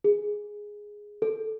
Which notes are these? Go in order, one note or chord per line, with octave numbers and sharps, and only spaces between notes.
G#4
A4